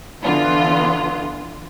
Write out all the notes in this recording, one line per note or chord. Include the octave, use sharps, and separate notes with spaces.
D3 E3 B3 F4